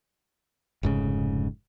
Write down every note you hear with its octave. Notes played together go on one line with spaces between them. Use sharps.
F1 G#2 C#3